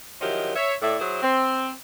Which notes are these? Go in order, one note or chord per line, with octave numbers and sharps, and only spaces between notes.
D#3 F3 F#3 E4 G4 D#5
C#5 E5
A2 E4 D5
F#3 E4 G#4 C5
C4